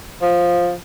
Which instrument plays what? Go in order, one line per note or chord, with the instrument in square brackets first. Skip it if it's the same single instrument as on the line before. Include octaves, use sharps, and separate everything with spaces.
[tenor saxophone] F3